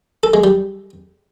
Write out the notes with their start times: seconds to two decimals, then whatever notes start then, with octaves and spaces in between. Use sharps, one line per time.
0.23 A4
0.34 G#3
0.44 G3